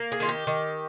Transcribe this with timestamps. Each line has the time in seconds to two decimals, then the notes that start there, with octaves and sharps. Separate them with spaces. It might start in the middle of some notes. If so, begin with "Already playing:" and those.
Already playing: A#3
0.12 G#4
0.20 D#3 F4
0.29 G4
0.47 D#3